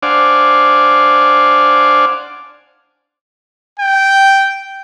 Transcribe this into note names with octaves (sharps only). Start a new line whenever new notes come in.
D4 C5 D5 F5 F#5 G#5
G5